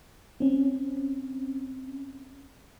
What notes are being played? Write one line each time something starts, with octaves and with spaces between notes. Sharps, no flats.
C4 C#4